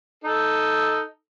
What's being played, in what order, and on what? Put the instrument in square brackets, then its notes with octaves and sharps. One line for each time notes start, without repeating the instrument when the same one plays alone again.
[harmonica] D#4 A4